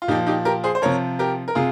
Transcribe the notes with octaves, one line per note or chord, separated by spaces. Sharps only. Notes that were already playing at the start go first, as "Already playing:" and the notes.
F4
A#2 F3 D#4 G4
D#4 G4
G4 A#4
G#4 C5
C5
C3 F3 A#4 C#5
G4 A#4
A#4
C3 F4 G#4